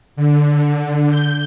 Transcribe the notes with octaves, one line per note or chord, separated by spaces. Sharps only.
D3
G6